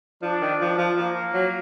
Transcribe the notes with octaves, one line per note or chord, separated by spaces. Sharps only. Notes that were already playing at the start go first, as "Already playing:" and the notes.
F3 D4
D#3
F3
F3
F3 A#3
F#3